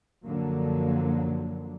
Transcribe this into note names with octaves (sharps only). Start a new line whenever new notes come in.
F#2 D3 F3 F#3 A#3